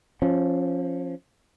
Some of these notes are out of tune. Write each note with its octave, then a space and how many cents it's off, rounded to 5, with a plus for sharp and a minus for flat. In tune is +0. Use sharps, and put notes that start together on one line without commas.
F3 +0 C#4 -20